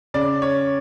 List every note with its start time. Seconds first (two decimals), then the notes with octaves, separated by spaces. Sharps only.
0.14 C#3 D5
0.42 C#5